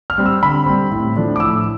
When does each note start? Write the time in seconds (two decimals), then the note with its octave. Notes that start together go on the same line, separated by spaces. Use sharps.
0.10 F6
0.18 G3 C4
0.26 E6
0.42 D3 B5
0.66 G3 C4
0.91 A2
1.16 F3 A3 D4
1.36 D6
1.40 A2 E6